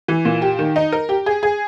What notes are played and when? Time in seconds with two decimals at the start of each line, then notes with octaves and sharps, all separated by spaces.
0.08 E3
0.25 A#2
0.42 G4
0.59 D#3
0.76 D#4
0.92 A#4
1.09 G4
1.26 G#4
1.43 G#4